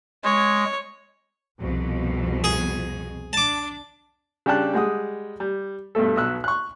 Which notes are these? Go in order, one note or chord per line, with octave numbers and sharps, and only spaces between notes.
G#3 C#5
C2 F2 B2
G#4
D4 A5 D6
C#3 G3 D4 G5 A5 F#6
G3 G#3 F#5 D#6
G3
G2 B2 A3 A4
B1 B2 E6 F#6
C#6 F#6